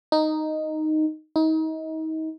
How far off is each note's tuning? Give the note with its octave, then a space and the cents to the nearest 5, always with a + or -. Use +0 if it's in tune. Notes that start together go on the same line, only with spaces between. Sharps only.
D#4 -5
D#4 +30